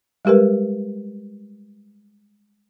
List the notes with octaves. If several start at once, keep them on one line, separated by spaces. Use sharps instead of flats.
G3 G#3 G4 A#4 B4